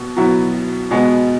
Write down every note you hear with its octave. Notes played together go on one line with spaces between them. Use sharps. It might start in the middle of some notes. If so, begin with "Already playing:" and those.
Already playing: B2 B3
B2 F#3 B3 E4
B2 G#3 B3